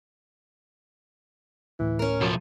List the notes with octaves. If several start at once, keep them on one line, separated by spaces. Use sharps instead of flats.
D2 A2 E3
C#4 A#4
B1 F3 F#3